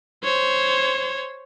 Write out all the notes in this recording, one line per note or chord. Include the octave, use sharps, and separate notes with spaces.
C5 C#5